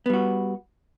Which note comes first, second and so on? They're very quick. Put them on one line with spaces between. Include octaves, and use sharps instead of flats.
B3 G3 F#4